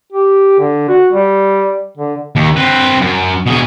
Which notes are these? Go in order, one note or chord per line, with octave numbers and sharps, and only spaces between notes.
G4
D3
F#4
G3
D3
D#2
C4 B4
F#2
B2 G#4